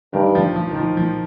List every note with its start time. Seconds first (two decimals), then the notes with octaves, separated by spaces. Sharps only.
0.13 G2 D#3
0.35 F3
0.56 F3
0.71 D#3
0.76 F3
0.97 F3